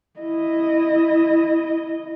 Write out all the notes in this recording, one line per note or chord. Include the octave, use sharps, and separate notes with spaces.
E4 D#5